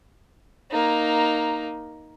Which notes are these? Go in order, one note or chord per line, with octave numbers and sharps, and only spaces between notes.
A#3 D#4